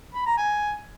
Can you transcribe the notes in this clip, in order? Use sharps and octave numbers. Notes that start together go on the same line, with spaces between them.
B5
A#5
G#5